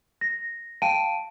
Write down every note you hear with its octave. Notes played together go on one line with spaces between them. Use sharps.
A#6
F5 G5 A5 D7 D#7